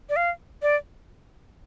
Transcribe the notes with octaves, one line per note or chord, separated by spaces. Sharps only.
D5
F5
D5